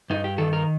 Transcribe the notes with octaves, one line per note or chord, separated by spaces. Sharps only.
G2 D#4
G4
D#3 A4
A#4